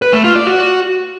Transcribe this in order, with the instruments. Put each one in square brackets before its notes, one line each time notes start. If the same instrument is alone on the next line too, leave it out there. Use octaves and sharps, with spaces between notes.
[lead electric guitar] B4
A3
F4
D5
F#4